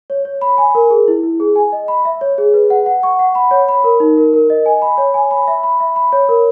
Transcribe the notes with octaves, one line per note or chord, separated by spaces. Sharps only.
C#5
C#5
B5
G#5
A#4
G#4
E4
E4
G#4
G#5
D#5
B5
E5
C#5
G#4
B4
F#5
F#5
C#6
F#5
B5
C#5
B5
A#4
D#4
A#4
A#4
D#5
G#5
B5
C#5
G#5
B5
E5
B5
E5
B5
C#5
A#4